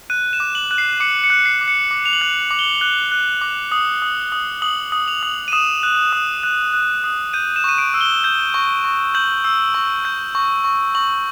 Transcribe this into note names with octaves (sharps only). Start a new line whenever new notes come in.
F#6 D#7
E7
D6
F#7
F#6
C7
D6 C#7
C#7
F#6
C7
D6
C#7
D6
F7
F#7
F#6
D6
G7
F#6
F#6
D6
D#6
D#6
D#6
D#6 F#7
D#6
F7
D#6
D#7
D#6 E7
F#6
D#6
F#6
F#6
D#6
G6 D#7
E7
C#6 D#7
D7
E6
G7
G6
C#6
C#6
G6 F#7
E6
C#6
G6
C#6
C#6
C#6 F#7